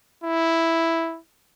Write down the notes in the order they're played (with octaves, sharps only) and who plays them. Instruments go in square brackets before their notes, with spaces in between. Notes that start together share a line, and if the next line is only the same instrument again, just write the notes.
[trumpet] E4